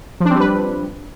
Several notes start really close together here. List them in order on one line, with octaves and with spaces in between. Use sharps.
F3 D4 C4 G3 B4